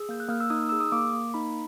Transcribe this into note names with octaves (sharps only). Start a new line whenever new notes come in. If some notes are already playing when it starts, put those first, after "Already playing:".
Already playing: G#4 E6
A#3 G6
F#6
A#3 F6
E6
D#4 D#6
G#4 E6
D#6
A#3 D6
A#3
D#4 B5